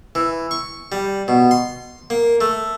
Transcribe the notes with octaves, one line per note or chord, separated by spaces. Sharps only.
E3
C#6
G3
B2
C6
A#3
A3